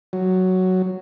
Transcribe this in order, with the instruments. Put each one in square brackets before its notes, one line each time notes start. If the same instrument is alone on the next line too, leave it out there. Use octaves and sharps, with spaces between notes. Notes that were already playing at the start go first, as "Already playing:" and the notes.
[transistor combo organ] F#3